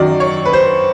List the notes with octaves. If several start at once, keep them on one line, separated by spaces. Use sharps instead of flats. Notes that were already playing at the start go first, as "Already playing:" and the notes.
Already playing: F#2 D#3 F#3 D5
C#5
B4
C5